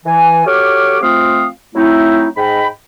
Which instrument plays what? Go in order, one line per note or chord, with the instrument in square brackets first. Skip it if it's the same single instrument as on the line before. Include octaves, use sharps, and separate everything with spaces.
[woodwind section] E3 G#5
F#4 G4 A4 C#5 D6 F6
F3 A3 C4 F4 F5 D#6
F#3 A3 C4 D#4 E4
G#2 D#5 G5 B5